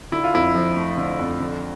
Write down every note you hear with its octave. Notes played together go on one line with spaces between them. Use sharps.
D3 E4
F4
F2 E4
F3
A3
D3
F2
D3